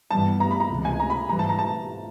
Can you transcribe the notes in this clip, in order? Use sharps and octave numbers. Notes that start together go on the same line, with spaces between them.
G2 E3 G3 B3 A5
A#5
B5
A#5
C#2 C3 E3 G#3
G#5
A#5
B5
G#2 E3 G3 A#5
A5
A#5
A5